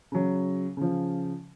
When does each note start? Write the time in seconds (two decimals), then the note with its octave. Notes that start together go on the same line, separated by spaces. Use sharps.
0.12 C#3 F#3
0.77 C#3 F3